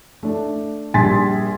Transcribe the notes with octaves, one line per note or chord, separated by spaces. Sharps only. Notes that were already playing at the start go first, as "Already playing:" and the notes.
A3 D4
A#1 G3 G#5 C6 A6 B6